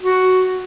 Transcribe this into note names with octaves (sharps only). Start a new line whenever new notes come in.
F#4